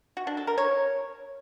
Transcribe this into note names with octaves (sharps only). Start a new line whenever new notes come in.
F#4
D4
A4
A#4
C#5